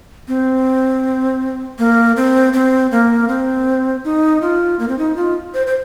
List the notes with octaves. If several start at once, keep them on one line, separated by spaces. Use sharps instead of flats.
C4
A#3
C4
C4
A#3
C4
D#4
F4
A#3
C4
D#4
F4
C5
C5